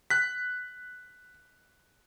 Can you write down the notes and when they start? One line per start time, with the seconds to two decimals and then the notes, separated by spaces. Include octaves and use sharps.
0.10 F#6 B6